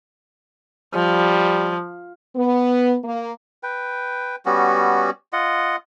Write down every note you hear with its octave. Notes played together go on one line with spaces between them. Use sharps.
F3 G3
B3
A#3
B4 G5
G3 B3 C#4 F#4
F4 D#5 F#5